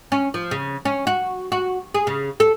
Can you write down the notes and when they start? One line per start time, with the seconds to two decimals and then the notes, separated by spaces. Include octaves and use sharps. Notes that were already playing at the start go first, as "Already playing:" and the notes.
0.12 C#4
0.34 F3
0.51 C#3
0.85 C#4
1.07 F#4
1.52 F#4
1.94 G#4
2.07 C#3
2.40 A4